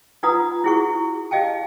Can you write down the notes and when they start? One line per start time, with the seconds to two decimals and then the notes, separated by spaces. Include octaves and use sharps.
0.23 D#4 F4 B4 F#5 A#5 D#6
0.64 E4 F#4 G#4 F#5 C#6
1.31 G4 D#5 F5 G5 A5